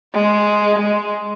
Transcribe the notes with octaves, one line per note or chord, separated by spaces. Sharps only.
G#3
G#3